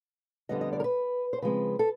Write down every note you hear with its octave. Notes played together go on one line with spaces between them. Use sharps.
F2 D3 G3 B3 D#5
D#5
D5
A#4
B4
C5
C#3 F3 G#3 C4 B4
A4